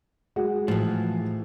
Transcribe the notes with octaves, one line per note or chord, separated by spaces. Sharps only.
G#3 F#4 G#4
A2 E3 F3